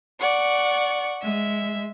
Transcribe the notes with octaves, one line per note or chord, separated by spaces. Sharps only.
D5 F#5 C#6
G#3 E5